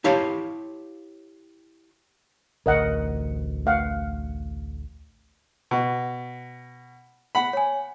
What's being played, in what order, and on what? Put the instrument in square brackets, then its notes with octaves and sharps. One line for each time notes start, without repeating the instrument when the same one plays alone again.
[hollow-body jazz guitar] E4 G4 C#5 F5 A5
[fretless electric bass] A1 D2 [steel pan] A#4 D#5 F#5
[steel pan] A3 F5 F#5
[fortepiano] B2
F#5 B5
[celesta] C#5 G#5